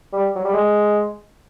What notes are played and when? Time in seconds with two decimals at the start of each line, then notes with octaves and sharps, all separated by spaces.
0.13 G3
0.35 F#3
0.44 G3
0.53 G#3